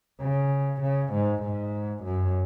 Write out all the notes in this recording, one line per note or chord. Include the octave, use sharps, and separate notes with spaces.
C#3
C#3
G#2
G#2
F#2